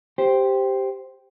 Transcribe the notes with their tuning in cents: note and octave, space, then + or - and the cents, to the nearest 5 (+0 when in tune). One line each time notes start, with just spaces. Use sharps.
G4 +0 C5 +0